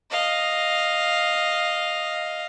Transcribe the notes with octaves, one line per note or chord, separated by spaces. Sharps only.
D#5 F5